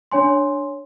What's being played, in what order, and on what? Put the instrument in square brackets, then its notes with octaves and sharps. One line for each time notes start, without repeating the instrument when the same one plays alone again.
[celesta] D4 C#5 G#5 C6